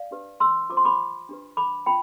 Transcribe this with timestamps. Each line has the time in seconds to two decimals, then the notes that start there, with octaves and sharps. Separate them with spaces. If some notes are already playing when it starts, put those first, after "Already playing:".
Already playing: D5 F5
0.11 D4 G4 B4
0.40 C6 E6
0.70 F4 C5 D6
0.77 C6
0.85 B5 D6
1.29 D4 G4 B4
1.57 B5 D6
1.86 F4 G5 B5